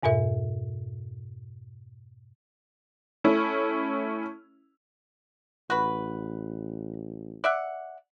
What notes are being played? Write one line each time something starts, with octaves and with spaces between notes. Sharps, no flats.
F2 G#2 B2 A#4 E5
A3 C#4 E4
A1 F#4 B4
D5 E5 F#5